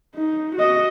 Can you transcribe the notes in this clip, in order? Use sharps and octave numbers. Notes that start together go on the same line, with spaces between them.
D#4
F#4 D#5